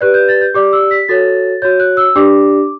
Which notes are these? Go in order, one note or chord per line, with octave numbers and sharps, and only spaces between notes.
G4 B4 D5 F#6
G6
A6
G6
G4 D5 D6
E6
B6
F#4 A4 C#5 A6
F#4 C#5 G6
F#6
E6
D4 G4 D5 D6